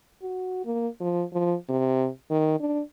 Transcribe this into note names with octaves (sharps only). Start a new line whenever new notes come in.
F#4
A#3
F3
F3
C3
D#3
D4